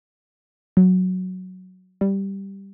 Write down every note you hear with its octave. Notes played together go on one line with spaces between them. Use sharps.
F#3
G3